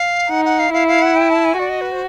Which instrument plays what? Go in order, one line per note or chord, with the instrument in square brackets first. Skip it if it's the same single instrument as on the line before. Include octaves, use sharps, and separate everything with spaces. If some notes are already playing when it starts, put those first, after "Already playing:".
Already playing: [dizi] F5
[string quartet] D#4 [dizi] F#5
[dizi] F#5
F5
[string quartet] E4 [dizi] F5
[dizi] F5
F#5
G5
A5
G#5
[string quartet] F#4 [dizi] D5
[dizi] D#5
B4
C5